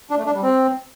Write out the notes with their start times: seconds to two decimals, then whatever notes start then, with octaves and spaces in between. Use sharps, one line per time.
0.10 D4
0.18 A3
0.26 D4
0.34 G3
0.42 C4